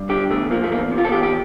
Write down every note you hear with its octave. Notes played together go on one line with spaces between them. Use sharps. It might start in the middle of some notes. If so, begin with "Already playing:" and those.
Already playing: G2
D3 G4
E2 A3
F3 A#3
A3
E2 A#3
C3
F4
A4
E2 G4
G4